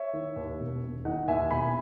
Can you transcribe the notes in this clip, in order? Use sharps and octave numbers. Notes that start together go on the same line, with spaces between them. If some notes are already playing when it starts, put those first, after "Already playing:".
Already playing: C#5 E5
D#3
D#2
E1
E1
D#3 D#5 F#5
D#2 E5 G#5
E1 G#5 B5